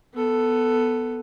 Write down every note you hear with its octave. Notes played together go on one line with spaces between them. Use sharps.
B3 A4